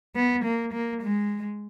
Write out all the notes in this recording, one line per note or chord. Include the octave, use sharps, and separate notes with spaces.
B3
A#3
A#3
G#3